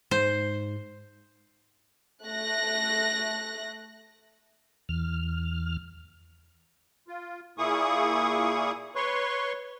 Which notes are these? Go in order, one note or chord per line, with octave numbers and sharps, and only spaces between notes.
G#2 C5
A3 F#6 A#6
E2 F6
F4
A#2 A#3 E4 G#4 C#6 D#6
B4 C#5 C6 C#6